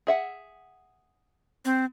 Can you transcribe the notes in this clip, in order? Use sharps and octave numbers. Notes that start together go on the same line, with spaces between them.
G#4 E5 F#5
C4